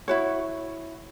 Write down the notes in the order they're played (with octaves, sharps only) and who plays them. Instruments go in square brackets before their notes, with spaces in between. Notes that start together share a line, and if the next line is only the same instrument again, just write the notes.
[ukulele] E4 F#4 C#5